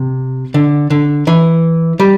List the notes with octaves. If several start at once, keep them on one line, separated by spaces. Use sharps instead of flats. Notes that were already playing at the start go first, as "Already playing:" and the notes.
Already playing: C3
D3
D3
E3
G3